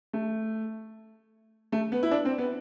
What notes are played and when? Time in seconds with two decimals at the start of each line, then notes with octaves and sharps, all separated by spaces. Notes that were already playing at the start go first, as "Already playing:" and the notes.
0.13 A3
1.72 A3
1.92 B3
2.03 E4
2.11 D4
2.25 C4
2.38 B3